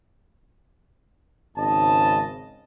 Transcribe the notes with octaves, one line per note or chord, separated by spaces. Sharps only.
G#1 G#2 C#3 D#5 A5